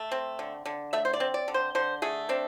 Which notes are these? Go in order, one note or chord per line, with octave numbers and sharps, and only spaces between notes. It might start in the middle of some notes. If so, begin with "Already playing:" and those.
Already playing: A3
C4
D3
D3
A3 E5
C5
D5
C4
D5
D3
C5
D3 C5
A3 G#4
C4 D4